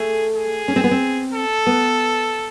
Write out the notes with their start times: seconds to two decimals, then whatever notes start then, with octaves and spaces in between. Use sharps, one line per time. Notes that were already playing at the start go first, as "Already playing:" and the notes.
Already playing: A3 G#4
0.35 G#4
0.68 C#4
0.76 C4
0.84 B3
0.91 C4
1.34 A4
1.67 B3